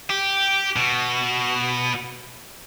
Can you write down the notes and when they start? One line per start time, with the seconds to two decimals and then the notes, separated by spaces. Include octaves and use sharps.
0.10 G4
0.76 B2